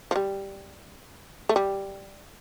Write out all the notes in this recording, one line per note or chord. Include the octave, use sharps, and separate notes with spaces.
F3
G3
A3
G3